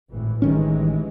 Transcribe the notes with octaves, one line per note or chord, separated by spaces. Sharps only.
G#1 A2 E3
A1 D#3 E3 G3 G#3 C#4